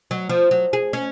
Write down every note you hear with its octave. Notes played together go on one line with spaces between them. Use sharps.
F#3
F3
F#3
G#4
C#4